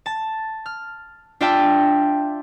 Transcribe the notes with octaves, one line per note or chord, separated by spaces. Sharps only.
A5
F6
D4 F4 D5 E5 G5 A5